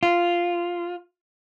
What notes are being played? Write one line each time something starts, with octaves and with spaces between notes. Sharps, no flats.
F4